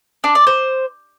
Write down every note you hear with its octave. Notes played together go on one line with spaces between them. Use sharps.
D4
D5
C5